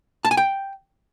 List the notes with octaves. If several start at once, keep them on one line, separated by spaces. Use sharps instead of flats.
A5
G#5
G5